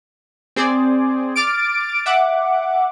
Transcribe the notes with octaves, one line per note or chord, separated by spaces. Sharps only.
C4 G#4 C5 D5
D6 F6 A6 D7
E5 F#5 D6